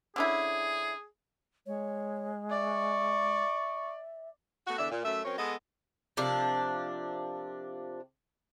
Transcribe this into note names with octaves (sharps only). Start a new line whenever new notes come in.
D3 C#4 E4 G#4
G#3 C#5
D5 E5 C#6
A3 B3 F#4
E2 D3 D5 E5
A#2
F#2 A3 E5
F#3 C4 C#4 A#4 C#5
G#3 B3 A4 D#5
C3 F3 D4 A#4